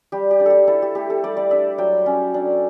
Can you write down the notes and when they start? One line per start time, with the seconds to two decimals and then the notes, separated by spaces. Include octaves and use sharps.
0.12 G3 G4
0.31 G4
0.40 D4
0.46 G4 A4
0.67 E4 A4
0.82 G4
0.95 A3 G4
1.10 A4
1.23 G3 D5
1.37 D5
1.51 D4 E5
1.78 F#3 G5
2.06 C#4
2.34 D4